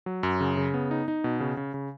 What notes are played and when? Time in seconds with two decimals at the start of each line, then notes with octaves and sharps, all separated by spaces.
0.06 F#3
0.23 F#2
0.41 C#3
0.57 C#3
0.74 B3
0.91 D#4
1.08 D#4
1.24 B2
1.40 C#3
1.57 C#3
1.74 C#3